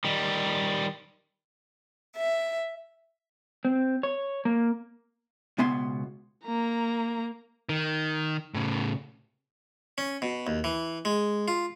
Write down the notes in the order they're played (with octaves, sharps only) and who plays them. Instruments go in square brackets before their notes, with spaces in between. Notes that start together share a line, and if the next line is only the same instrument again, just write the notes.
[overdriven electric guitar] D#3 G3
[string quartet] E5
[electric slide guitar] C4
C#5
A#3
[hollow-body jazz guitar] C#2 B2 B3 E5 G#5 C6
[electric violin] A#3 A#5
[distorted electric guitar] D#3
A2 C#3
[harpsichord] C#4
B2
D#2
E3
G#3
F4